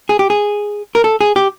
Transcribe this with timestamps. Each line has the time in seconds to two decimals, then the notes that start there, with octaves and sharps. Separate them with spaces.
0.09 G#4
0.19 G4
0.30 G#4
0.95 A#4
1.04 A4
1.21 G#4
1.36 G4